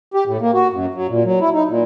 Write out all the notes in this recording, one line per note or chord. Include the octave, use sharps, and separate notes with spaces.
G4
A2
A#3
F#4
F#2
F#3
A#2
F#3
E4
D#4
A#2